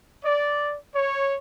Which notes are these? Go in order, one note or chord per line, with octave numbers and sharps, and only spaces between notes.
D5
C#5